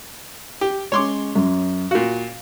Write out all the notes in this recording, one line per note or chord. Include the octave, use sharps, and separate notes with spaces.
G4
G#3 C#4 C#5 C6 D6
F#2
A#2 F#4 F5